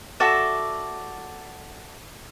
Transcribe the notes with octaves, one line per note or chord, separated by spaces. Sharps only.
F#4 A4 D5 E5